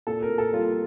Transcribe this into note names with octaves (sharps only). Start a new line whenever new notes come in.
A#2 A4
A#4
A#2
A4
G3 F4